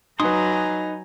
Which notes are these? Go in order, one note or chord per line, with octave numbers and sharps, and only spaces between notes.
F#3 D#4 B4 G#5 A#5 C6 D#6